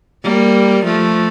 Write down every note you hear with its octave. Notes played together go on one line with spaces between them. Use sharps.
G3 A#3
F3 A3